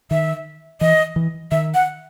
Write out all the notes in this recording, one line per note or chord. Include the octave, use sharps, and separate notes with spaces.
D#3 E5
E3 D#5
E3
D#3 E5
F#5